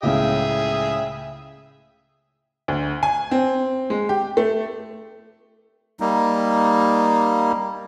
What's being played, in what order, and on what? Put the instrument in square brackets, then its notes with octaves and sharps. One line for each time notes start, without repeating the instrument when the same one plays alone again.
[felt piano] C#2 A2 C#3 [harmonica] G#4 E5 G5
[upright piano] D2
G#5
C4
G#3
G4
A3
[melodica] G3 A#3 D#4